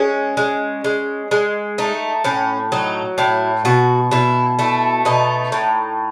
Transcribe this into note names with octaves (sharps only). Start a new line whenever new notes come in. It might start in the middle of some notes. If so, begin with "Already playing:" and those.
Already playing: G#3 C#4
G#3
G#3
G#3
A3 D#4
A2 C#4
F#3 D#4
A2 E4
B2 F#4
B2 E4
A3 E4
B2 D#4
A2